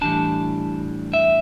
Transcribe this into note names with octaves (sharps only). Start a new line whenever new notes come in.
A2 E3 G3 D4 A5
E5